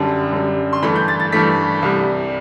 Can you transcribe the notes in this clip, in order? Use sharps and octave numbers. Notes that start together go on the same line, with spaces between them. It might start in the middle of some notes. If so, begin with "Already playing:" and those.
Already playing: F#2 D3 G3 A5
F#2 D3 G3
C6
G2 E3 A3 B5
G6
A6
A6
G2 E3 A3 B6
C2 C3 G3